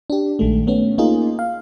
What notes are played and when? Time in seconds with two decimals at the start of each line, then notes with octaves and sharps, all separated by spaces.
0.10 D4 G4
0.39 A#1 D#3 G#3 A3
0.67 A3 B3 C#4
0.98 A#3 C#4 D#4 F4 G#4
1.39 F5